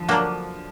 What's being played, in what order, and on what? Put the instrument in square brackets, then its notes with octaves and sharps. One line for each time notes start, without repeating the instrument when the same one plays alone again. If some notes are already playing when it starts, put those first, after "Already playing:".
Already playing: [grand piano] D3 F3
[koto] F#3 A#3 D4